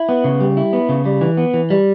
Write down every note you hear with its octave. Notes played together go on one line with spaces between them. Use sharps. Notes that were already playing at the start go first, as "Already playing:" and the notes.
Already playing: E4
B3
C#3
G3
E4
B3
C#3
G3
E3
B3
E3
G3